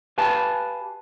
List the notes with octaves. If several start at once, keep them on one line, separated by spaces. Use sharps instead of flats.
G4 B4 F5 G#5 A5